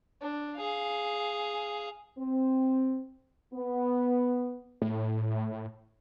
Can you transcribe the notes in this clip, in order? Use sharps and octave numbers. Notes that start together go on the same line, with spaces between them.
D4
G#4 F5
C4
B3
A2